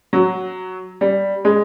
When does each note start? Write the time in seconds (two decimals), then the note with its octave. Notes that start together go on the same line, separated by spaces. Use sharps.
0.13 F#3
1.01 G3
1.45 G#3